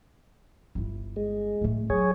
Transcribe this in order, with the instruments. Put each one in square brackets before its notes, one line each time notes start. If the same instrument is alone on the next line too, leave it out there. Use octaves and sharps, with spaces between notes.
[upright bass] G1 E4
[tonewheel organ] G#3
[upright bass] A2 A3
[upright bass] F#3 [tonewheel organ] G#4 C#5